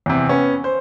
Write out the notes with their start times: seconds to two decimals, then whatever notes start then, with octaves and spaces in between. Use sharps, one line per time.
0.06 E2 C3
0.29 B3 C#4
0.64 C5